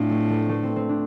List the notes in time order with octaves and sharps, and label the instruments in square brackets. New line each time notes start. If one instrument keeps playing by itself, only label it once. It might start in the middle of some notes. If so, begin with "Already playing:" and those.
Already playing: [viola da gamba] A2 [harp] C4 D4 F4
[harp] A3
A3
A3
C4
C4
D4